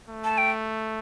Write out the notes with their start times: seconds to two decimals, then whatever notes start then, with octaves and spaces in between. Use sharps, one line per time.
0.09 A3
0.24 A5
0.38 G5